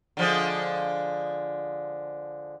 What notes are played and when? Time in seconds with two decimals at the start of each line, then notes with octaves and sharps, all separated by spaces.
0.17 D3 F3 G#3